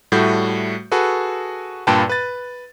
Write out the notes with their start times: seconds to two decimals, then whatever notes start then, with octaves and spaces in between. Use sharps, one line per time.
0.12 A2 G3 A3 F#4 G6
0.92 F#4 G#4 A4 B4
1.87 G2 A#2 B4 G5 A5
2.09 B4 A6